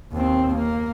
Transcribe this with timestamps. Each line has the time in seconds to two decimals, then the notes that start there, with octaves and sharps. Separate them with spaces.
0.13 D#2 C4
0.55 A#3